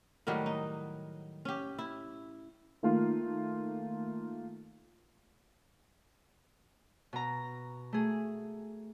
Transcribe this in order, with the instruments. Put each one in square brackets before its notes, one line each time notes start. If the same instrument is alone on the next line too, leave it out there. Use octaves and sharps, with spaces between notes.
[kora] A2 D#3 F#3 G3
D#4
C#4 G4
E4
[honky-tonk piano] D#3 A3 A#3 F4
[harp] B2 A#5
A3 G#4